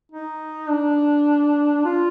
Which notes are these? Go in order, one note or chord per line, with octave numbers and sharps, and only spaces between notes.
D#4
D4
F4